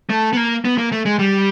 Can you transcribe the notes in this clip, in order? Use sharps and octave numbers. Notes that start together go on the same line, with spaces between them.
A3
B3
A#3
B3
A#3
A3
G#3
G3